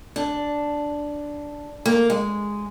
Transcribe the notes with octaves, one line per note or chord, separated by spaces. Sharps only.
D4
A#3
G#3